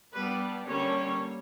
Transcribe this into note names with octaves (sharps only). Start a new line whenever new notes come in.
G3 B3 D4 B4
D3 G3 A#3 C#4 C#5